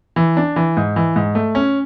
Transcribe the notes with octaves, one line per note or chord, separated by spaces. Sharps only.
E3
D4
E3
G#2
E3
G#2
A3
C#4